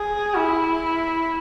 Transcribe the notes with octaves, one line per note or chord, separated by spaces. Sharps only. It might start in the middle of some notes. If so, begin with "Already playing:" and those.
Already playing: G#4
E4